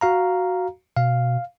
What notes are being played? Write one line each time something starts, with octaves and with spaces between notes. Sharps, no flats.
F#4 F5 A#5
B2 F5